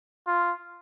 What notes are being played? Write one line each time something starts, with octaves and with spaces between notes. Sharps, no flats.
F4